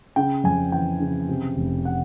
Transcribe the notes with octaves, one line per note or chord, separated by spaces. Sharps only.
C#3 G5
F2 G#5
E3 G5
C#3
C3
F1
F#5